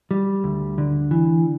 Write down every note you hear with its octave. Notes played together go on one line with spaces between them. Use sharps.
G3
D2
D3
E3